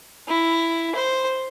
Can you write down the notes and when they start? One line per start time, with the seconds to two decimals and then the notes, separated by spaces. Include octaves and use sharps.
0.27 E4
0.95 C5